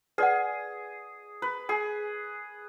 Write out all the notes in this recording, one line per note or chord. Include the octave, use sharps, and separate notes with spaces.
G#4 B4 D5 F#5
B4
G#4 G#5